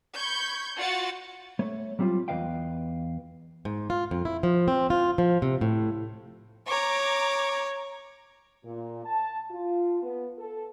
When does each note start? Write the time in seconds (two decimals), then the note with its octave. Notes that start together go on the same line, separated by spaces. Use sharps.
0.16 B5 C#6 G6 G#6
0.77 F4 F#4 F#5 A6 C#7
1.59 A3 C#5
1.99 F#3 G3 C4 C#4 F4
2.28 E2 D#3 B4 D#5 F5 G5
3.65 G#2
3.90 F4
4.11 F2
4.25 E4
4.43 F3
4.68 C4
4.90 F4
5.18 F3
5.42 C3
5.61 A2
6.68 C#5 A#5 D6
8.64 A#2
9.05 A5
9.50 F4
10.03 B3
10.38 A4